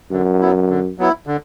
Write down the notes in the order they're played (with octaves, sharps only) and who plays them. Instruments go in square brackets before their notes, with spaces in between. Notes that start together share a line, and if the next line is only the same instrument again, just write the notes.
[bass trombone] F#2 [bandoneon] D3
[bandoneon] F#3 B3 E4
D3
F#3 B3 E4
D3